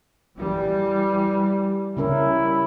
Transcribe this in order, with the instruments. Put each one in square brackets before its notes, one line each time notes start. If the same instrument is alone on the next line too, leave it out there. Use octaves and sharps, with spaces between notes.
[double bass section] E3 G3
[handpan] C#3 C#4 A#4 [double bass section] G3 [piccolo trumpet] E4